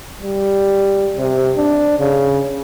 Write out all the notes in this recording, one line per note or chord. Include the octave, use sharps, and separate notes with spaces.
G3
C3
D4
C#3